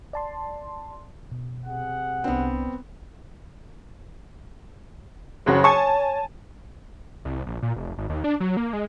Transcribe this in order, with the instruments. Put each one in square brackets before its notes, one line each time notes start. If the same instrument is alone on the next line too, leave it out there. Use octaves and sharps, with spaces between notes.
[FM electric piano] D5 A5 C6
B2
[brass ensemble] C3 G#4 F#5
[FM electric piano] C2 D4 [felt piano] B3 C4
[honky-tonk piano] F#1 C#3 F#4 [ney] C#5
[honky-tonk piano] G#5 A5 [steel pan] C#6 D#6
[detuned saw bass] C2
A#1
A#2
F1
G#1
D#2
D4
F#3
A#3
G#3